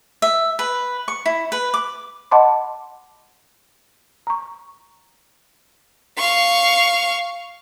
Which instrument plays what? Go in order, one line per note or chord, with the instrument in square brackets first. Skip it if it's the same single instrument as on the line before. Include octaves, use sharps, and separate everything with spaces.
[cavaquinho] E5
B4
C#6
E4
B4
D6
[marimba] D#5 F#5 A5 B5 C6 D6
A#5 C#6
[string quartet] F5 C#6